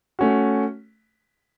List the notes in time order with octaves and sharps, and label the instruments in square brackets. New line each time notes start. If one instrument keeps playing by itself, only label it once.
[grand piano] A3 C#4 F#4